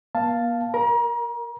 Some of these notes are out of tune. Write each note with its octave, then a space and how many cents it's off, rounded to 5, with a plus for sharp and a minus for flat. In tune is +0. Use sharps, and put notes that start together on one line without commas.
A#3 +45 F5 +0 A5 +5
A#4 +5 A#5 +35